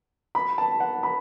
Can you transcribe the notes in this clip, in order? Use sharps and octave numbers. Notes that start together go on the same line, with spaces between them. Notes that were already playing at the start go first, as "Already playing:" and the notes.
B5
A5
F#5
B5